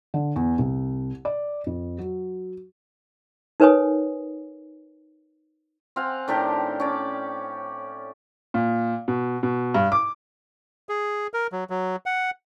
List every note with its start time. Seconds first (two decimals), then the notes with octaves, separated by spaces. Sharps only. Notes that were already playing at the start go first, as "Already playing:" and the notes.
0.14 D3
0.36 E2
0.59 C2
1.25 D5
1.66 F2
1.98 F#3
3.60 D#4 A#4 B4 C#5 G#5 D#6
5.96 C4 F5 F#5 G#5
6.28 A2 D#3 D4 G4
6.80 C#4 D5
8.54 A#2
9.08 B2
9.43 B2
9.74 G2
9.92 D6
10.89 G#4
11.34 A#4
11.52 F#3
11.70 F#3
12.06 F#5